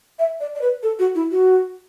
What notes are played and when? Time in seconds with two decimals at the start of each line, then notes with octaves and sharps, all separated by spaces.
0.19 E5
0.41 D5
0.55 D5
0.62 B4
0.83 A4
0.99 F#4
1.15 E4
1.31 F#4